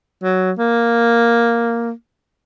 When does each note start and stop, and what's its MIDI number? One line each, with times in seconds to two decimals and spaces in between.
0.23 0.52 54
0.59 1.91 58